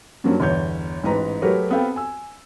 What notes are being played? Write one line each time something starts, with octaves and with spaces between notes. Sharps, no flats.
G2 F3 F#3 A#3 C#4
G1 E2 C#5 G6
A1 G#2 B4 A#5
F#3 A3 G4 A#4 B4 C#5
B3 C4 A4 F5 G5
G#5 E6